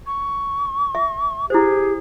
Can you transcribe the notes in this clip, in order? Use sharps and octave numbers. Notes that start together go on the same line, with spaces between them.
C#6
E5
E4 G4 G#4 C5